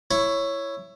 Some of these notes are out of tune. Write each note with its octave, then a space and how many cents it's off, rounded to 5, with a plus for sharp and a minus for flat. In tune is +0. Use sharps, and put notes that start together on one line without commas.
E4 +15 C#5 +0